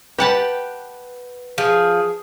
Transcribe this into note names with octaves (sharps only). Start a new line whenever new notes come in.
G4 B4 F#5 G5 A5
F3 G#4